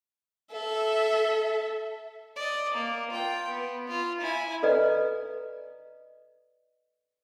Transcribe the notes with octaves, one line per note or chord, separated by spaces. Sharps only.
A4 E5
D5 D#5
A#3
F4 G5
B3
F4
E4 G#5
A4 B4 D5 D#5 A#5